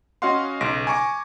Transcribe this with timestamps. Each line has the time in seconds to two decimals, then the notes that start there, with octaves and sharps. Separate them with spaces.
0.22 C#4 F#4 D#5 F5 F#5 C6
0.61 B1 C#3 C6 A#6 D7
0.87 G#5 A#5 C#6 D6